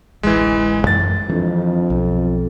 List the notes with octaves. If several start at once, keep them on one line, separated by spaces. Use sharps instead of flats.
D1 A1 E3 G#3
F#2 E3 G#3 A6
F2 E3 D4
B1